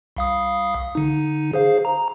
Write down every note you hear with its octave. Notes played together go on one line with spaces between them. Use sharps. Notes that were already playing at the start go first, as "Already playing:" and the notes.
C2 F5 D#6
D3 D#4
G#4 C5 F5
A#5